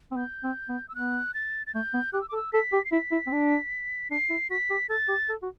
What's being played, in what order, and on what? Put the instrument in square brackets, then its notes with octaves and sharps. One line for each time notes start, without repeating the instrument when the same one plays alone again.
[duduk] C4
[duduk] B3 [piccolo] G6
[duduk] C4
B3
[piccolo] E6
[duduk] B3 [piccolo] F#6
[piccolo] A6
A6
[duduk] A3 [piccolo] G6
[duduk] B3
[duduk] G4 [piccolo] F#6
[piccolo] E6
D6
[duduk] A4
[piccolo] E6
[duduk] A4 [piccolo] B6
[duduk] G4
[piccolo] C7
[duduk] E4 [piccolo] B6
[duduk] E4
C4
D4
[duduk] D4 [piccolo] C7
[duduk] E4
[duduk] F#4 [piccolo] B6
[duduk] G4
[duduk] A4 [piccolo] A6
[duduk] G4
A4
F#4